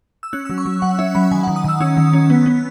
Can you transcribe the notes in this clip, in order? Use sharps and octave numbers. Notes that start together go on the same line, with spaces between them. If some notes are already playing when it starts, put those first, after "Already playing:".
E6
C#4 F#6
E6
F#3
C#6
F#3
F#3 F#5
C#4 E5
F#3 B5
D#3 G#5
F#5
D#3
D#6
D#3 E6
C#4 E6
D#3
C#4
B3
B3